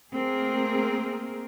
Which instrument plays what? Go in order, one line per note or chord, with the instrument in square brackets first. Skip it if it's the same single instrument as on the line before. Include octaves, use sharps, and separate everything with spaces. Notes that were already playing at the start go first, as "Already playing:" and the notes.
[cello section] A3 A#3 C4 G#4 A#4